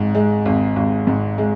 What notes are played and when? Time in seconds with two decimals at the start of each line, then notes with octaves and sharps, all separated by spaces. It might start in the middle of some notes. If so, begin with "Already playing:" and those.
Already playing: G#1 G#2
0.15 G#3
0.45 G#1
0.76 G#1
1.07 G#2
1.38 G#3